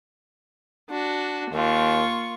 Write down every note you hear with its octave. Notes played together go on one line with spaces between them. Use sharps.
D4 F#4
D#2 A#3 F4 C#6